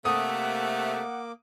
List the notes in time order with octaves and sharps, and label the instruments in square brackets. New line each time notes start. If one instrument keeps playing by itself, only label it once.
[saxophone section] C3 A3 [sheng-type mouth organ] A#3 D6 [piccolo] F#5 [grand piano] D#6